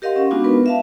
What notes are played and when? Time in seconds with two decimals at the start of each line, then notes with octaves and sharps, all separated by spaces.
0.02 G4 A#4 D#5 F5 F#5 C6
0.16 C#4
0.31 G#3 B3 D4 D#4 F4 F#4
0.44 B3 A#4 B4
0.66 E5 F5 A5